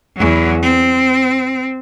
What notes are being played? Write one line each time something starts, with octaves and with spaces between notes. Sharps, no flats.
E2 F#3
C4